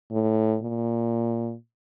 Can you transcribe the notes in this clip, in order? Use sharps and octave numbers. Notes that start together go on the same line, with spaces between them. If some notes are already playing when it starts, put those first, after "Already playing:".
A2
A#2